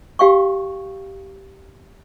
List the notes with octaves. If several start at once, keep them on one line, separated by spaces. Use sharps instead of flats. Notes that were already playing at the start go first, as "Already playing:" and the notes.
G4 F5 G5 C#6